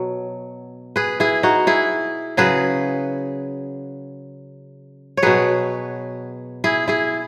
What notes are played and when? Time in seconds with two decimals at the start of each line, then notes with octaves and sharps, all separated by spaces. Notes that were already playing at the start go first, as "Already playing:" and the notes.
Already playing: B2 F#3
0.96 G#4 B4
1.20 E4 G#4
1.43 D#4 F#4
1.67 E4 G#4
2.37 C#3 F#3 G#4 B4
5.17 C#5
5.23 B2 F#3 G#4 B4
6.64 E4 G#4
6.88 E4 G#4